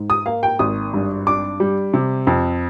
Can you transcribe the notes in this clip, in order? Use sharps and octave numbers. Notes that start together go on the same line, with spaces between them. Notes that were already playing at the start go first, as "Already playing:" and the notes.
Already playing: G#2
D#6
A#3 F5
G5
G#1 D#6
G2
D4 D6
G3
C3
F2